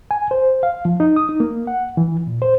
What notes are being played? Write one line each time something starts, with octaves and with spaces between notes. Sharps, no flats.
G#5
C5
F5
F3
D#4
D#6
D#4
A#3
F#5
E3
A#2
C5